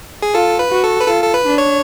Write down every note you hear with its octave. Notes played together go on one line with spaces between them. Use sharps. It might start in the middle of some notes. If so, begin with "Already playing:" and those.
G#4
F4 A4
B4
F#4
A4
B4
F4 A4
A4
B4
D4
C#5